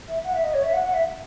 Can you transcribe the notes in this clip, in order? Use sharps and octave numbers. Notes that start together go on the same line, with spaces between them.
E5
F#5
E5
D#5
C#5
E5
F#5
F#5
E5